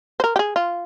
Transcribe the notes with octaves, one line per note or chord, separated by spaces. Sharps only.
C5
A#4
G4
G#4
F4